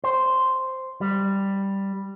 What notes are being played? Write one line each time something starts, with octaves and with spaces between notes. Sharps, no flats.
C5
G3